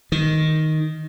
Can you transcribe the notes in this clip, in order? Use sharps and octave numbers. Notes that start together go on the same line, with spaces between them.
D#3